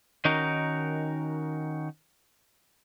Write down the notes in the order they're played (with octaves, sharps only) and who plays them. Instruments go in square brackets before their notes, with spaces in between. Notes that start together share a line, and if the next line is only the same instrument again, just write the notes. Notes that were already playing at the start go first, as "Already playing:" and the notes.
[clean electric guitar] D#3 C#4 D#4 F#4 A#4